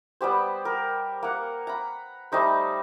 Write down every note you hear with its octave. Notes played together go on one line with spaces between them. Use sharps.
G3 B3 G4 C5
A#4
A#3 F#5
A#5 B5
G3 A3 D#4 C5